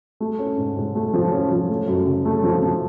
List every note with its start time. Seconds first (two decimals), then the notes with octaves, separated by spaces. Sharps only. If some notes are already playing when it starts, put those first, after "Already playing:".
0.20 A3
0.39 C#4
0.57 G#2
0.76 G#2
0.95 A3
1.14 F3
1.32 C#4
1.51 F3
1.69 A3
1.88 F#2
2.06 C#3
2.25 A3
2.44 F3
2.62 F3